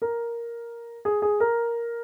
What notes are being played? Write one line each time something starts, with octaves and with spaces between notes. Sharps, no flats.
A#4
G#4
G#4
A#4